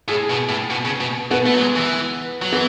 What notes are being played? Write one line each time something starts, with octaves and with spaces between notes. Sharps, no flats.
A2 G#4
B2
A2
B2
C#3
B2
B2 B3
A3
F#3
G#3
E3
F#3
E3 B3